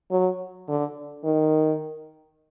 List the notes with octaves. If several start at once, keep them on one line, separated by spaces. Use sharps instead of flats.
F#3
D3
D#3